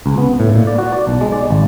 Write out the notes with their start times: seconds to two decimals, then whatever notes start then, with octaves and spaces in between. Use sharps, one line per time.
0.06 C#2
0.18 B3
0.40 A2
0.56 A#2
0.67 D5
0.78 F#4
0.92 D5
1.07 B1
1.21 G#3
1.32 D5
1.50 G#1